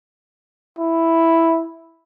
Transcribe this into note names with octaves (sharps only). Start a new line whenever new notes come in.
E4